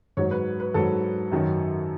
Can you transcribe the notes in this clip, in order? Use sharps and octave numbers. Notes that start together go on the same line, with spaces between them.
G#2 F#3 C#5
B4
B4
G#2 F#3 A4
F#2 D#3 F#3